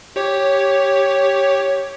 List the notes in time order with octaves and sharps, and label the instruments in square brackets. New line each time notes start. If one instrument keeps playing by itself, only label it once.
[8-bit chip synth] G4 C#5